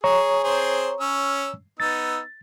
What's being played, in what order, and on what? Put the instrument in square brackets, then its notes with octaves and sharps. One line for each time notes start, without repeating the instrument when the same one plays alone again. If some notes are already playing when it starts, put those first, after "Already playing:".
[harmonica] G#4 [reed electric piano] C#5 A#5 C#6
[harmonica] C4 G#4 C5
C#4 E6
[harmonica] B3 D#4 E6 [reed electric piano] A6